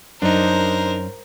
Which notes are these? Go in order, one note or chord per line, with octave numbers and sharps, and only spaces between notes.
F#2 D4 D#4 A#4 C5